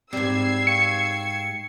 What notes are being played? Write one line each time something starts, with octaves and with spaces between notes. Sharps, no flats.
G#2 G3 C4 E6 G#6 C7
F5 G5 C#6 C#7